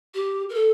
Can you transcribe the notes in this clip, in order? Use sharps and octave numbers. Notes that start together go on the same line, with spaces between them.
G4
A#4
A4